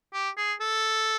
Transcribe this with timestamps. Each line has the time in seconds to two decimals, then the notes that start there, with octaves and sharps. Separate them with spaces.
0.13 G4
0.37 G#4
0.61 A4